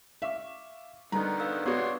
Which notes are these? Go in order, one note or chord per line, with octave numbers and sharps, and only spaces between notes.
E5 F5 C#6 D6
D3 D#3 G3 B3 A#5
B4 F5 E6
B3 D4 F#4 C#5 C6 D#6